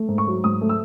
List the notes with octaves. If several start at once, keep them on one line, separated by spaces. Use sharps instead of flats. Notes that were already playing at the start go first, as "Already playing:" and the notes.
Already playing: A3
G#2
C#6
F#3
G#2 D#6
A3
E6